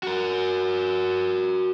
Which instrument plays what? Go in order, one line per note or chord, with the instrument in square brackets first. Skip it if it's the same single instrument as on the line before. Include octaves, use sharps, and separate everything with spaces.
[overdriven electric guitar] F#4 A#4